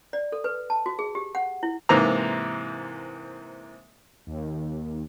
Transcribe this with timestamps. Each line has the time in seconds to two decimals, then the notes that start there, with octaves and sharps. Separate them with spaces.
0.13 D5
0.32 A4
0.44 B4
0.70 A5
0.86 F#4
0.99 G#4
1.15 G4
1.35 F#5
1.63 E4
1.89 G#2 C3 E3 A#3 C5 A#5
4.27 D#2